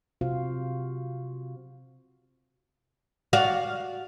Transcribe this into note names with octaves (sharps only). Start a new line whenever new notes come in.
C3 F4 F#4 C5 F5
F#4 D5 F5